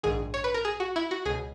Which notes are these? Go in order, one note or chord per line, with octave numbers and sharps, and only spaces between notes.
A#1 G#2 D#3 G#4
C#5
B4
A#4
G#4
F#4
E4
F#4
C#2 B2 G#4